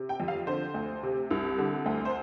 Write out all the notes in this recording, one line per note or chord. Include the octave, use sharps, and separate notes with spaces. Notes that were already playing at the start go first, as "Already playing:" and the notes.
Already playing: C3
G5
F2
F5
D3 C5
D2
C3
C2
D3
D2
C5